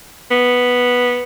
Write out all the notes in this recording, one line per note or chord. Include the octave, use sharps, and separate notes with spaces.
B3